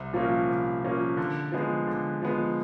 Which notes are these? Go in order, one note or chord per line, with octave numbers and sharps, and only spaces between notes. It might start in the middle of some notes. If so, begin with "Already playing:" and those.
Already playing: C2
A#2 F3 A#3 C#4
C2
A#2 F3 A#3 C#4
D3
F3 G#3 B3
D3
F3 G#3 B3